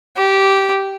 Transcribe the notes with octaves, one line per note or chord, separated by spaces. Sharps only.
G4